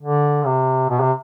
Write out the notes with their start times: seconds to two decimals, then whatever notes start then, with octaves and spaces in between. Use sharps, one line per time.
0.01 D3
0.45 C3
0.89 B2
1.00 C3